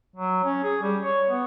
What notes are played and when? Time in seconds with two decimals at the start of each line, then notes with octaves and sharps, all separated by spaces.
0.16 F#3
0.44 C#4
0.64 G#4
0.82 G3
1.03 C#5
1.30 B3